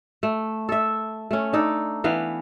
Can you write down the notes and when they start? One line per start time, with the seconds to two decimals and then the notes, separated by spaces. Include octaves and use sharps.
0.23 A3
0.69 A4 E5
1.31 A3 C#4
1.53 D4 D#4 A4
2.04 E3 B3 F5